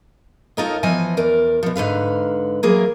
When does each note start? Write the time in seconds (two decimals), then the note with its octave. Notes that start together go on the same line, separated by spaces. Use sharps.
0.57 D#4 F4 A4 A#4 C#5 D#5
0.83 E3 F3 B3 D#5 G#5
1.17 E2 A#4 D5
1.63 B2 F3
1.76 G#2 D3 B4 F5
2.63 E3 F#3 A#3 F4 G#4 A#4